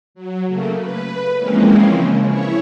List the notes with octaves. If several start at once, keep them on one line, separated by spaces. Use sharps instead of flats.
F#3
C#3 A3 A#3
B4
E3 F3 G#3 A#3 C4 C#4
C#3
E4 C#5